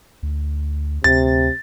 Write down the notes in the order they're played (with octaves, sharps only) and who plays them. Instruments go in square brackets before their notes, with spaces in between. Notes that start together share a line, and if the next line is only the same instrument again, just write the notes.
[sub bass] D2
[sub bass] D2 [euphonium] C3 [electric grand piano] A6